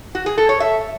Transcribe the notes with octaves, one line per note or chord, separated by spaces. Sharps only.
F#4
G#4
A4
C#5
E5